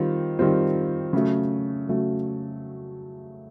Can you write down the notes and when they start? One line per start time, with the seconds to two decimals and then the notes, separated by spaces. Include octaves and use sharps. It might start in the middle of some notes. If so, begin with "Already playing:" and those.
Already playing: D#3 G3 C4 F4
0.39 D#3 G3 C4 F4
1.13 C#3 F#3 A3
1.89 C#3 F#3 A3